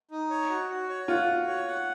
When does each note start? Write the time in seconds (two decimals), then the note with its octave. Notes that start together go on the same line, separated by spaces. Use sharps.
0.11 D#4
0.30 C#5
0.50 F#4
0.70 F#4
0.89 C#5
1.08 F4 F#5
1.28 F#4
1.47 C#5
1.68 F#5